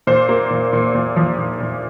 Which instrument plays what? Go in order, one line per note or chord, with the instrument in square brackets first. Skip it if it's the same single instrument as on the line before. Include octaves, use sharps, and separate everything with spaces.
[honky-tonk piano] A#2 C5
A#3
A#2
A#2
A#2
F3
A#2
A#2